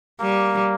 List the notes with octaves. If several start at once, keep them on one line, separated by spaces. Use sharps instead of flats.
G3 A#3